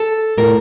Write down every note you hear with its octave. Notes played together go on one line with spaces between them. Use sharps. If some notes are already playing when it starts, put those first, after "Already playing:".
Already playing: A4
A2 A#4